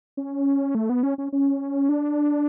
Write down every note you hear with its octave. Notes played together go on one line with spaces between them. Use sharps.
C#4
A3
B3
C#4
C#4
C#4
D4